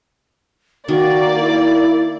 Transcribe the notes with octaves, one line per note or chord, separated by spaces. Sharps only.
D#3 A#3 F#4 D5
E4